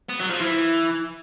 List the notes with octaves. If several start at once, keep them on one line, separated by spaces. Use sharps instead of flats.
B3
F#3
F3
E3